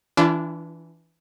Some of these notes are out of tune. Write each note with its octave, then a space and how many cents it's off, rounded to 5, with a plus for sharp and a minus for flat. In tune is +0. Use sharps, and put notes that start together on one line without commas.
E3 +0 D4 -15 F4 -45